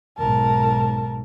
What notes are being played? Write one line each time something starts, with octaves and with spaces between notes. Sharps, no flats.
B1 G#2 A#4 A5